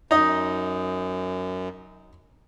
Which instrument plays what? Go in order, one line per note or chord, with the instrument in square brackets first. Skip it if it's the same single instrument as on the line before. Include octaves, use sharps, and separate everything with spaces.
[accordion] F#2 [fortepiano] D#4 D#5